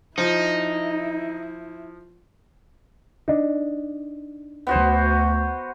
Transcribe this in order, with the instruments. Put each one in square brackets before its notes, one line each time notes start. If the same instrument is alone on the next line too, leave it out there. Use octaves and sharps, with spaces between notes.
[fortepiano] F3 [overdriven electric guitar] D#4 [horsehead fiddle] E4
[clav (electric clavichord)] D4 D#4
[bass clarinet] D2 [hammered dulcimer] B3 F#4 C5